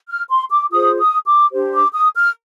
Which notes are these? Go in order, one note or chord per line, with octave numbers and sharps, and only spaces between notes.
F6
C6
D6
F4 G#4 C5 D#6
D#6
D6
D4 G4 C5
D6
D#6
F6